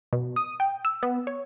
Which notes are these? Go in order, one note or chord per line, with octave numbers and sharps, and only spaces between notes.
B2
D#6
G5
E6
B3
C#5